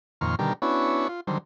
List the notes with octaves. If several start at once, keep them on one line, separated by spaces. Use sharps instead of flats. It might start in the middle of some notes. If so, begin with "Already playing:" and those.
F2 A#2 D#3 C6 C#6 F6
B2 D3 D#3 G3 G4 A#4
B3 C#4 D4 E4 F#4 C#5
F4
D3 D#3 F#3 G3 C5